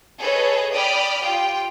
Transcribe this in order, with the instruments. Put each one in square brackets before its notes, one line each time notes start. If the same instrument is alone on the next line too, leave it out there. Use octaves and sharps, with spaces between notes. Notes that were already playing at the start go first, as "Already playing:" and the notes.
[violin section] G#4 A4 B4 C#5 D#5
D5 G5 B5 D#6 F6
F4 G4 G5